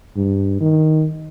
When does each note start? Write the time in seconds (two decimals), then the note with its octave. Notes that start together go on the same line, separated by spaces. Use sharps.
0.17 G2
0.61 D#3